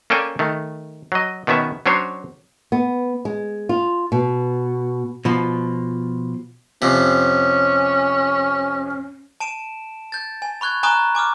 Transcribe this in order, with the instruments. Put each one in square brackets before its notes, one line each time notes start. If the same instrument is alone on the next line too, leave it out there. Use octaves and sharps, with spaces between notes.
[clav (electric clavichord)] A#3 C#4 A4 D5 G5 G#5
D#3 A3
F#3 D#5
B2 D#3 B3 C#4 E5
F#3 C#4 D4 C5 C#5
[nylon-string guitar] B3
G#3
F4
B2
[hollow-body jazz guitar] B2 F3
[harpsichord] F2 C3 [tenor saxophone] C#4
[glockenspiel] A5 D7 E7
G6 A6
G#5
B5 C#6 F#6 G#6
G#5 A#5 B5 C#6 D#6 F#6
G#5 D6 D#6 F6